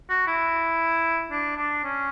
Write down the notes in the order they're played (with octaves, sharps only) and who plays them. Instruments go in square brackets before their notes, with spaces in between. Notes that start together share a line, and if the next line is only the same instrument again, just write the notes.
[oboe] F#4
E4
D4
D4
C#4